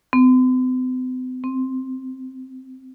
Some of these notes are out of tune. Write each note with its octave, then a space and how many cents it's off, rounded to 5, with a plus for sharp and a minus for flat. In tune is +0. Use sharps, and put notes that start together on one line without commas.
C4 -45
C4 -5